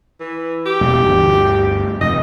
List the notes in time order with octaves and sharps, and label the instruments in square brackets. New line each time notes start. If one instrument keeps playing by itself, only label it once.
[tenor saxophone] E3
G4
[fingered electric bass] E1
G1 D2
[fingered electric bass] F1 [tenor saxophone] D#5